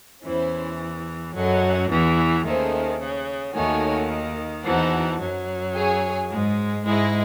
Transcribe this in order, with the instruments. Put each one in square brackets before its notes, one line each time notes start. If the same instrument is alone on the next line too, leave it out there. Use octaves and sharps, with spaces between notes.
[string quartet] E2 E3 [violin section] C#4 E4 C5
[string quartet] F#2 F#3 [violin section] C#4 F#4 A4 D#5 F#5
[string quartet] E2 E3
[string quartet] D#2 D#3 [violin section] A3 C#4 G#4 C5 E5
[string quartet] C#3
[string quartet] D#2 D#3 [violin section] A3 D#4 F#4 C#5 G#5
[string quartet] E2 E3 [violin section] D#4 F#4 C5 F#5 A5
[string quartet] F#2 F#3
[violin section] G#4 C#5 G#5
[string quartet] G#2 G#3
[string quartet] G#2 G#3 [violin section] E4 G#4 D#5